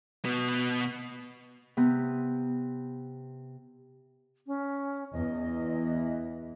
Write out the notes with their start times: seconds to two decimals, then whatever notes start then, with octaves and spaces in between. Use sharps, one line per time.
0.25 B2 B3
1.77 C3 B3
4.47 C#4
5.13 E2 E3 D#5